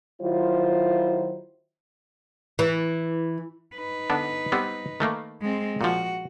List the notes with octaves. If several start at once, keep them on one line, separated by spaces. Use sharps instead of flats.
D#3 F#3 E4 F4 C5
E3
D#4 B4
D3 B3 D4
G3 B3 C4
D#3 A3 A#3
G#3 C4
A#2 F3 F#4